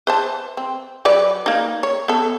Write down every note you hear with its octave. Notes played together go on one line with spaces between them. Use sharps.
B4 C5 A5
C4
F#3 B4 D5
A#3 D#4
C#5
B3 A4